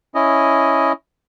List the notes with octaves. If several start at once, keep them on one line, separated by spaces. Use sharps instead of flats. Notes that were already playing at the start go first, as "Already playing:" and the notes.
C#4 E4 D#5